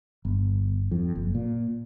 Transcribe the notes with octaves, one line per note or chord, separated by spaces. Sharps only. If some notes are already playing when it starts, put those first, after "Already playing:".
G1
F2
F#1
A#2